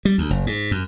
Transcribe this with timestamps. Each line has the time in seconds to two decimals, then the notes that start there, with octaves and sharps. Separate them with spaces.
0.05 G3
0.18 D2
0.30 F#1
0.47 G#2
0.71 F#2